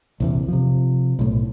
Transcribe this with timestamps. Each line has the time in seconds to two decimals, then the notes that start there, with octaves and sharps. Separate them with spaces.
0.20 A#1 E2 C3
0.48 C3 F3
1.19 B1 A2